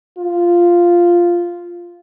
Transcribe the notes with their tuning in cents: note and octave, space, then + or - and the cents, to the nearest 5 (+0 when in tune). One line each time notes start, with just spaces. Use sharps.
F4 -5